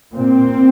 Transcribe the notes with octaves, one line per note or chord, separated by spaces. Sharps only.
A#2 C4